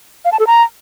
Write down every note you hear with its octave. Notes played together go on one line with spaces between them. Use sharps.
F5
A5
A4
A#5